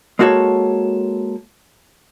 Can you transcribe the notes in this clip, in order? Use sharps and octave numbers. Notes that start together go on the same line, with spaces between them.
G#3 A#3 F#4 A4 C#5